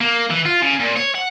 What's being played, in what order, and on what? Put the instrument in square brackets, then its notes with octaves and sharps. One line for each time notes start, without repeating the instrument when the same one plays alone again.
[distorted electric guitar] A#3
E3
F4
C#3
A#2
C#5
F#5